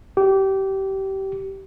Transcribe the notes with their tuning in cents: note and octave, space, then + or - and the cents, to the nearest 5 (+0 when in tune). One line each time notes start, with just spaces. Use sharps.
G4 -25